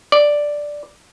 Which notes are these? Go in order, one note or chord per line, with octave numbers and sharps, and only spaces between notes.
D5